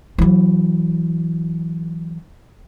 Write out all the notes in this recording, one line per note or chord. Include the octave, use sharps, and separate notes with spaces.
E3 F#3